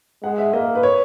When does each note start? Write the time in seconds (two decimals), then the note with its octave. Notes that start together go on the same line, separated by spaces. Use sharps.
0.23 G#3 F#5
0.38 E5
0.53 A#3 D#5
0.75 B4
0.83 C#5